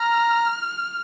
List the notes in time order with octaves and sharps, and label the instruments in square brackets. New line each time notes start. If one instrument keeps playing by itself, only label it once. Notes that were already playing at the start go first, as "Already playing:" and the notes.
Already playing: [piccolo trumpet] A#5 [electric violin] F6